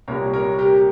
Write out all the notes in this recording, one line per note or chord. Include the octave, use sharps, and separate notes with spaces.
C2 A#2 G3 A#3 A#4 C#5
A#4 C#5
G4 A#4